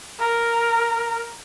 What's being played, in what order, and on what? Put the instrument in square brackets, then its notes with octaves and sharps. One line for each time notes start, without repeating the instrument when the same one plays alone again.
[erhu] A#4